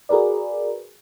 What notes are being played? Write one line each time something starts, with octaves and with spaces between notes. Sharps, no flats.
F#4 G#4 A#4 B4 D5